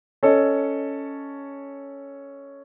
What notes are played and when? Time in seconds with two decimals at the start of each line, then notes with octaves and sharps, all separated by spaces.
0.23 C#4 A4 C#5 D#5